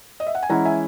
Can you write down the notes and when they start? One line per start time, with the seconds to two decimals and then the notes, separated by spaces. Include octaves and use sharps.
0.20 D#5
0.27 E5
0.35 F#5
0.43 G#5
0.49 E3 G#3 C#4 E4 F#5 A#5
0.65 E5 G#5